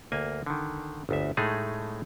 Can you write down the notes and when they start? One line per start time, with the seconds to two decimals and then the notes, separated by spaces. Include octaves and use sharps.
0.12 D2 A#3 G#5
0.46 D3 D#3
1.09 G1 D2 E5
1.37 A2 G#3 A3 D#4 G#4